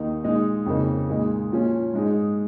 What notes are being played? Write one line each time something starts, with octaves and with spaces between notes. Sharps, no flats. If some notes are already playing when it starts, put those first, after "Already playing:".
Already playing: D#2 D#3 D#4
A#2 G#3 D#4
F2 C#3 A#3 D#4
A#2 G#3 D#4
A#2 F3 C#4
G#2 G#3 D#4